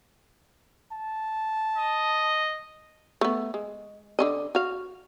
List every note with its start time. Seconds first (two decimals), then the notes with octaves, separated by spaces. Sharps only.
0.91 A5
1.77 D#5
3.21 A3 B3
3.54 G#3
4.19 D3 C#4 D#5
4.55 F#4 F5